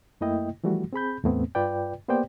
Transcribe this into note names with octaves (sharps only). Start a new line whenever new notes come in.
F#2 A3 A#3 E4 D#5 G5
E3 F3 G3 A3 F#4
C4 G#4 B5 G6
E2 A2 A3 B3 C4
G2 F4 B4 D5 G5
A#3 B3 G4 C5 D5 G5